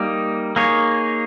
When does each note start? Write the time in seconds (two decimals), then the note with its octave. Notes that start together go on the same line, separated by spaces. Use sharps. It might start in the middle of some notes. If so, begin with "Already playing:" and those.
Already playing: G3 A#3 D#4
0.56 A#3 D#4 G#4 C#5